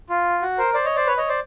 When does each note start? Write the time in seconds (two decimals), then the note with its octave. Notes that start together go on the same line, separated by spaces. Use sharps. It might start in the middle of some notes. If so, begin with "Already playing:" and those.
0.10 F4
0.42 F#4
0.58 A#4 C5
0.74 C5 D5
0.85 C#5 D#5
0.96 C5 D5
1.07 B4 C#5
1.17 C#5 D#5
1.28 C5 D5